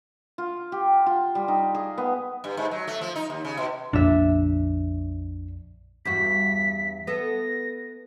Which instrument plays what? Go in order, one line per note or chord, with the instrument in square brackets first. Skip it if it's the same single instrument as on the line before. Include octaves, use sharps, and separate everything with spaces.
[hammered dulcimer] F4
G4
F#5
F4
G3
D#4
G#4
B3
[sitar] G2
G#2
F#3
A3
F3
D#4
D#2
C#3
B2
[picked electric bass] A#1 F2 [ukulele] D4 E5
[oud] E2 G2 F#4 [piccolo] B6
[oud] B3 A4 [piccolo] A#6